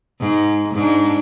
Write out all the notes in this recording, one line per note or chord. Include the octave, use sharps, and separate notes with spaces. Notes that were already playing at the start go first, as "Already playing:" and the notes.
G#2
G#2 D4